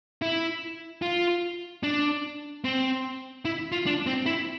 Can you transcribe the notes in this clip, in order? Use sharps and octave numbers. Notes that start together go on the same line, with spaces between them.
E4
F4
D4
C4
E4
F4
D4
C4
E4